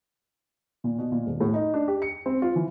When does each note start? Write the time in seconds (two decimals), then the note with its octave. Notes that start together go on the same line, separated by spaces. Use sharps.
0.84 A#2
0.98 B2
1.12 A#2
1.26 D#1
1.41 A2
1.54 D#4
1.74 D4
1.88 G4
2.02 C#7
2.26 C4
2.42 F4
2.56 E3